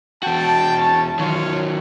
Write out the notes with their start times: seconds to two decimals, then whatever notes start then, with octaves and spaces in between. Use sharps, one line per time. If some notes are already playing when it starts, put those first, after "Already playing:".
0.23 E2 F#4 G5 A5
0.77 C#4 A5
1.19 D#3 F#3 F4 C#5